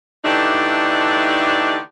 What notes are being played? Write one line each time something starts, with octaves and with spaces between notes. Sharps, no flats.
D3 E3 A3 D4 D#4 G4